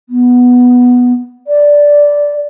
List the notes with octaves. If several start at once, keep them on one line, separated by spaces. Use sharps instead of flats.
B3
D5